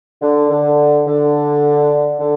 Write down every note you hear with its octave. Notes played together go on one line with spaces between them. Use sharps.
D3
D3
D3
D3